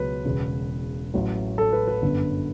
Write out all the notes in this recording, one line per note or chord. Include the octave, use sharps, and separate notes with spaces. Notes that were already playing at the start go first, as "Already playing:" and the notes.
Already playing: C#2 B2 F#3 B4
E1 E2 C#3
A1 A2 F#3
A4
B4
B4
G1 F#2 D3